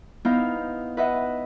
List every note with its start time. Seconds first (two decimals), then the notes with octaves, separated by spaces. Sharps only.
0.25 B3 D#4 E4 C5 F5
0.97 B4 D#5 E5 F#5